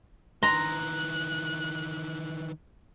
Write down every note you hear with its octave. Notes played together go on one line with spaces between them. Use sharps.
D#3 E3 A#5 C6 F#6